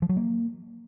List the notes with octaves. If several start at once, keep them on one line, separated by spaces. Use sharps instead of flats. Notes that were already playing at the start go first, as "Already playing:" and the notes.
F3
F#3
A#3